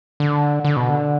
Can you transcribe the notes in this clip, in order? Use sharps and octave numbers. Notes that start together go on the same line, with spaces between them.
D3
D3
B2
D3